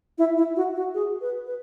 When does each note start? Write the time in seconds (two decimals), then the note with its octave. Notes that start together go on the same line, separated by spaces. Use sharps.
0.18 E4
0.37 E4
0.56 F#4
0.76 F#4
0.94 G#4
1.21 B4
1.47 B4